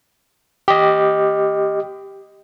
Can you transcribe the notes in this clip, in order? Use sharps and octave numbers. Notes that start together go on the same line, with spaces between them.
G4 D#5